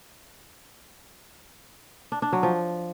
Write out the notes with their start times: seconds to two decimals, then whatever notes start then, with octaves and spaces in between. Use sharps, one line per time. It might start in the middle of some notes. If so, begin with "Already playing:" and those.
2.12 D4
2.22 D4
2.33 F#3
2.43 F3